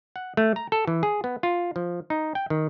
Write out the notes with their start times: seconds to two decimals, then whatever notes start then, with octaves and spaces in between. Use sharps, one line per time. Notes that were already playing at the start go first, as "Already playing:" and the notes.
0.16 F#5
0.37 A3
0.56 A#5
0.72 A4
0.87 E3
1.03 G#4
1.24 B3
1.43 F4
1.76 F3
2.10 D#4
2.35 G5
2.50 D#3